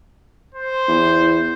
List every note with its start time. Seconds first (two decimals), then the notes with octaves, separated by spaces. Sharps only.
0.54 C5
0.88 E2